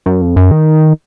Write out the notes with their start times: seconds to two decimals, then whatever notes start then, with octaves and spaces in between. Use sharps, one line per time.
0.06 F#2
0.22 F2
0.36 F#2
0.51 D#3